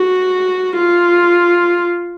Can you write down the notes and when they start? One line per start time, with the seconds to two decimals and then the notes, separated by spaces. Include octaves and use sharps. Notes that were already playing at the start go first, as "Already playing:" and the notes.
Already playing: F#4
0.76 F4